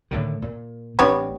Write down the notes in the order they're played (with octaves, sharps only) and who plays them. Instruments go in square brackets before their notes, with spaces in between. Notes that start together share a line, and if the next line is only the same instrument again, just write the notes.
[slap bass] A2 D3 D#3
A#2
[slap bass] A1 C4 D4 [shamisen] G3 B3 C#5